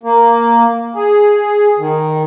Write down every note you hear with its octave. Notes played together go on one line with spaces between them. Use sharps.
A#3
G#4
D#3